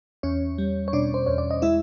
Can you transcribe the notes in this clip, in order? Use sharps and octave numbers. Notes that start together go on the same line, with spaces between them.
E2 C#4 C#5
G3
C#5
B2 D4 D5
C5
E2 C#5
D5
D#5
G#3 E4 E5